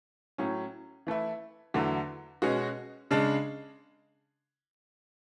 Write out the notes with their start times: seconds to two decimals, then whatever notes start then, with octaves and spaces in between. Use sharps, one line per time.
0.38 A2 F#3 C#4
1.07 E3 A3 E4
1.74 E2 D3 F#3 A3
2.42 B2 G#3 C#4 F#4
3.11 C#3 G#3 D4